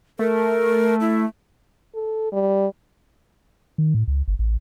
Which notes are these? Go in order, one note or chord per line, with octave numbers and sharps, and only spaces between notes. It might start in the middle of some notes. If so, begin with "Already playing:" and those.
A3 A#4
E4
A4
G3
D#3
A2
C#2
G1
A1